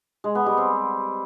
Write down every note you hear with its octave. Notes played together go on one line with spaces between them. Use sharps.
G#3
B3
G3
C4